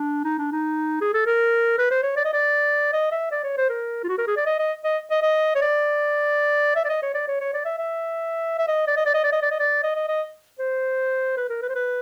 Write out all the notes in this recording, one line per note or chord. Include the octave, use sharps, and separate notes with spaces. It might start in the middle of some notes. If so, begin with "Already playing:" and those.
Already playing: D4
D#4
D4
D#4
G#4
A4
A#4
B4
C5
C#5
D5
D#5
D5
D#5
E5
D5
C#5
C5
A#4
F4
F#4
A#4
G#4
D5
D#5
D#5
D#5
D#5
D#5
C#5
D5
E5
D5
D#5
C#5
D5
C#5
C#5
D5
E5
E5
E5
D#5
D5
D#5
D5
D#5
D5
D#5
D5
D#5
D5
D#5
D#5
D#5
C5
B4
A#4
B4
C5
B4